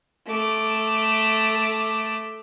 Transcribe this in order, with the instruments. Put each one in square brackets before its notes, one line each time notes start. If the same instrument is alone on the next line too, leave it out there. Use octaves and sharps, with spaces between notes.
[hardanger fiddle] A3 D6